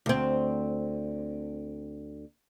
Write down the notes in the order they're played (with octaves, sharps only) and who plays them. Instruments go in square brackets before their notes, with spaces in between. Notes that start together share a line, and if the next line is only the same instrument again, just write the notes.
[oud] D2 C4